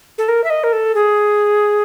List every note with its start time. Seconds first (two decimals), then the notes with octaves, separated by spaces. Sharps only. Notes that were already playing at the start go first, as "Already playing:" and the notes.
0.18 A4
0.28 A#4
0.44 E5
0.50 D#5
0.64 A#4
0.73 A4
0.95 G#4